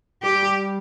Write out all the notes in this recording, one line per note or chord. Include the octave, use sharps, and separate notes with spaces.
G3 G4